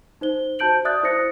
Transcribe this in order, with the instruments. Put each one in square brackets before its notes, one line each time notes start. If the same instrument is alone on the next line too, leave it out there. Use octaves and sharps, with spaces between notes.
[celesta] D#4 C5 G7
F#4 C5 A5 G6 D7 F#7
D5 E5 D#6 F#6 A6
E4 C5 D#6 A#6 C#7